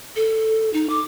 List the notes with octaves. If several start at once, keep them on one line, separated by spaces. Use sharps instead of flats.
A4
D#4
D6